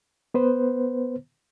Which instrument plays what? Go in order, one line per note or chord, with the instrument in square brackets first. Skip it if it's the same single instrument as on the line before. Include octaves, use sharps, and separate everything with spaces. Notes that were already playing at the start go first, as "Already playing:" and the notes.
[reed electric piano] B3 B4 C5